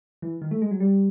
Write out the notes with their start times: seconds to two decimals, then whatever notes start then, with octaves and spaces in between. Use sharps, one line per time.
0.22 E3
0.42 D#3
0.51 A3
0.62 G#3
0.71 F#3
0.80 G3